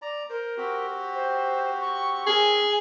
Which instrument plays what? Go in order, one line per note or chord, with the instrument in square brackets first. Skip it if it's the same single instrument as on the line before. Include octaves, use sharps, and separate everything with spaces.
[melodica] D5 A#5
[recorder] A#4 [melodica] C5
[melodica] C4 F#4 G4
[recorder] C5
C#6
[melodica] C4 C#4 A#4 [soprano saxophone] G#4 [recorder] G#5